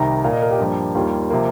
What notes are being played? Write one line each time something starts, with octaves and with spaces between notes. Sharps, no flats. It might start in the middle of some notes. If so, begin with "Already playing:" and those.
Already playing: C2 C3 D#3 A#5
A#2 A#3 F5
D#5
A#4
G4
G2 F3 A#3
D#2 D#3 G3 A#3 F4
C3 F3 A#3